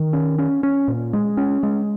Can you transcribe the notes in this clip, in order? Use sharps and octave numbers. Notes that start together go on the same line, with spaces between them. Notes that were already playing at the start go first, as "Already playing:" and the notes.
Already playing: D#3
C#4
C#4
C#4
A#2
G#3
C#4
G#3